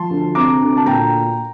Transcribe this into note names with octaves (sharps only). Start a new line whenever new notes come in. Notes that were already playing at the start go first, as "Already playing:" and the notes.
Already playing: F3 A5 C6
D2
C3 A#5 D6
D2
A5
A#2 G5 A#5